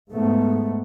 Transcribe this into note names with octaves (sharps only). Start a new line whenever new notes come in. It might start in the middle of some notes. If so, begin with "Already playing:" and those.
G#2 A3 B3